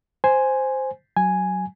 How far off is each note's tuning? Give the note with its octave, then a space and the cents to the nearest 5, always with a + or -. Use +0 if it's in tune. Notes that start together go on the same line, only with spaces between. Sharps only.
C5 +0 G#5 +0
F#3 +10 G#5 +0